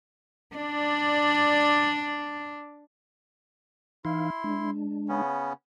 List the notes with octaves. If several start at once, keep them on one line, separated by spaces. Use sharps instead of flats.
D4 D5
E3 D#4 E4 F5 C6
G#3 D4
C#3 B3 C#4